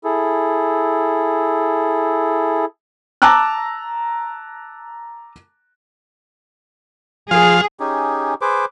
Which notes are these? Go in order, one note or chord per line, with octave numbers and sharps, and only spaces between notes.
E4 G#4 A4
A5 A#5 D6 E6 F#6
F3 G#4 F5
C#4 D#4 G4 G#4
G#4 B4 C5 D6